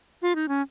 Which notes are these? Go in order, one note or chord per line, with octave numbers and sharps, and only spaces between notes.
F4
D#4
C#4